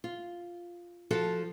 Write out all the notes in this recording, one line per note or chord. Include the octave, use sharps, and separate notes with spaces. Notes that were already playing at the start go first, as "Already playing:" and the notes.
F4
F3 F#4 A4